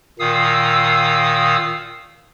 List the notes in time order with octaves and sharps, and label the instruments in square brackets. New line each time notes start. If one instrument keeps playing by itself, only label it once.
[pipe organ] A#2 D#3 F5 D#6 E6